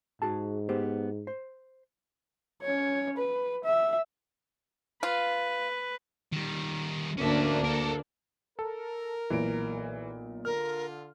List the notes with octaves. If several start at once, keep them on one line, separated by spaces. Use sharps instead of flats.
G#2 F#4 G#4 A5
B3 G4 C5
C5
C#4 C#5
B4
E5
F4 B4
D#3 G3
D2 A#3 C#4 D4 E5
A4 A#4
A4 A#4
B1 A#2 E3 D7
D3 F4 A#4 F6